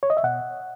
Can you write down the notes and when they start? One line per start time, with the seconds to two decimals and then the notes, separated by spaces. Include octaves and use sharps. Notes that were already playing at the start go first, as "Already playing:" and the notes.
0.03 C#5
0.10 D#5
0.17 E5
0.23 B2 F#5